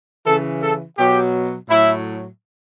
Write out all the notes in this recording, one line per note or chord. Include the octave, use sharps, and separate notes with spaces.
C#3 E3 A4
A4
B2 F#3 G4
A2 F#3 E4